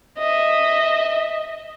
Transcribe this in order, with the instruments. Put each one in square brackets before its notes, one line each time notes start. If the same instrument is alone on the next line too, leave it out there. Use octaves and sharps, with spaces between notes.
[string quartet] D#5 E5